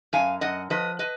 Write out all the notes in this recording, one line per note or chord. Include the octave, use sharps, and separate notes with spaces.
F#2 F5 G#5
F#2 D#5 F#5
F3 B4 D#5
B4 D#5